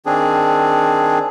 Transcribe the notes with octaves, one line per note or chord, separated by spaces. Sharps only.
D#3 C4 D4 G#4